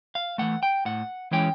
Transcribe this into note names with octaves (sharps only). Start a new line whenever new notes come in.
F5
E3 A3 F#5
G5
A2 F#5
E3 G#3 C#4 E4 G5